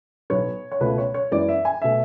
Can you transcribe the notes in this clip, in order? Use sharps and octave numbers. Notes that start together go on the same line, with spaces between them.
B1 B2 F#3 B3 C#5
C#5
C#2 B2 A3 B4
C#5
C#5
F#2 E3 G#3 B3 D5
E5
G#5
B2 A3 E5